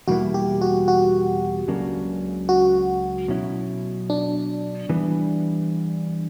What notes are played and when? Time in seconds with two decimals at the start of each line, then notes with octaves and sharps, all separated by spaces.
0.08 E2 B2 G3 A#3 E4 F#4
0.34 G4
0.61 F#4
0.88 F#4
1.68 C#2 C#3 F#3 A#3 D4
2.49 F#4
3.28 B2 F#3 C#4 E4
4.10 D4
4.89 E3 G3 B3